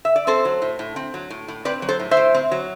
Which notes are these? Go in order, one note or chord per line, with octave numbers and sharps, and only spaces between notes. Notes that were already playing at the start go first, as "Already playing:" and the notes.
E5
D5
C4 A4 C5
F#3
A2
A2
C4
F#3
A2
A2
C4 B4 D5
F#3
A4 C5
A2
C5 E5
A2
C4
F#3